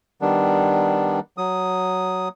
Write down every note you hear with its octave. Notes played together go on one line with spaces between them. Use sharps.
D#3 G3 B3 D4
F#3 D#6